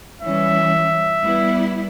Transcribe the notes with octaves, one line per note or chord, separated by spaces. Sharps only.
E3 G3 C#4 E5
G3 B3 E4